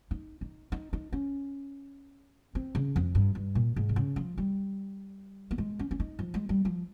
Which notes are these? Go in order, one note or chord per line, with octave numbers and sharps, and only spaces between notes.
D#4
D#4
D#4
D#4
C#4
C4
C#3
F2
G2
G2
A#2
G#2
C3
C#3
F3
G3
A#3
G#3
C#4
C#4
D#4
F3
G#3
G3
F3